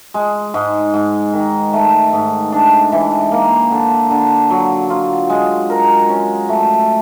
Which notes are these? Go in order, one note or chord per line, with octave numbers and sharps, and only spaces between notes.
G#3
G#2
G#2
D#3
A3
G#2
D4
E3
A#3
D3
D3
F#3
F4
G#3
A#4
C#4
A3